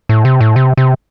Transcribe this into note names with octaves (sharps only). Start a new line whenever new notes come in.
A2
C3
A2
C3
C3